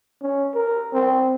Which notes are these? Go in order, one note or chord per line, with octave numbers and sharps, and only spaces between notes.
C#4
A#4
C4